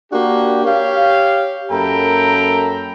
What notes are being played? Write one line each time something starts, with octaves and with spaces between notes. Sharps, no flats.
A#3 D4 F#4 G4
G4 C#5 F5
F#2 A#3 A4 G5 A#5 B5